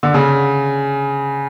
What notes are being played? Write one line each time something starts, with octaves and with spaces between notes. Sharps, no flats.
D3
C#3